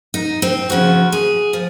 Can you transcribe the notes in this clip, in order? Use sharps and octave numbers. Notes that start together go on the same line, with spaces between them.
D#4
C4
D#2 C#3 F3 F#4
G#4
F3